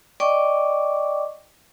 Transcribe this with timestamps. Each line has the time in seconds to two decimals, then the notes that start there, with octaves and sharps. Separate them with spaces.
0.20 D5 D#5 G5 C#6 D6